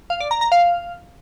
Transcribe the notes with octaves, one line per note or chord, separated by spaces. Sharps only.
F5
D5
A#5
A#5
F5